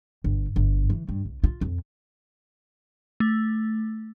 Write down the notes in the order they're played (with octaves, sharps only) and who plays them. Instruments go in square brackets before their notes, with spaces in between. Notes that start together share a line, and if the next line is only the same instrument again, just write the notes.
[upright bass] G1
G1
E3
G2
C2
F4
F2
[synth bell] A3